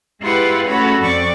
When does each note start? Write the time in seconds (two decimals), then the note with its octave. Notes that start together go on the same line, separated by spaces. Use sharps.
0.21 G#3 E4 F4 G4 B4 F#5
0.67 A3 C#4 F#4 A4 C#5 B5
1.01 F2 C4 D5 C#6